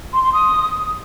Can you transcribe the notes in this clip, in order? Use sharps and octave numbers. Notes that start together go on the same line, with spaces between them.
C6
C6
D#6